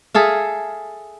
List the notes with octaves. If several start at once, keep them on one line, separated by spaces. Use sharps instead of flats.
G#4 A4 E5 F5